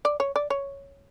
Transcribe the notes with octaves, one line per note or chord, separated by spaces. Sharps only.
D5
C#5
D5
C#5